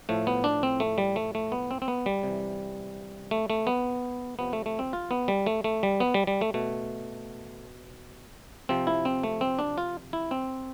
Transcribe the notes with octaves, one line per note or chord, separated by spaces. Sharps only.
A2 F3 A3
B3
D4
C4
A3
G3
A3
A3
B3
C4
C4
B3
G3
C3 E3
A3
A3
B3
C3 F3 B3
A3
A3
C4
F4
B3
G3
A3
A3
G3
B3
G3
G3
A3
B2 A3
C3 F3 C4
E4
C4
A3
C4
D4
F4
E4
C4